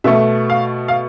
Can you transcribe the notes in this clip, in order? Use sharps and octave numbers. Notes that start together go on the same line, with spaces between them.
B2 A3 E5
F5
F5